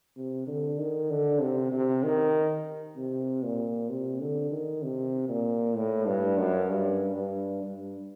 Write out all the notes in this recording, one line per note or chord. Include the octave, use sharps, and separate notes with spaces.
C3
D3
D#3
D3
C3
C3
D#3
C3
A#2
C3
D3
D#3
C3
A#2
A2
G2
F#2
G2
G2
G2